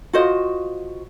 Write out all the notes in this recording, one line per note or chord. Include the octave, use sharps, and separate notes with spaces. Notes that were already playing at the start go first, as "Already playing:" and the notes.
F4 F#4 C5 D#5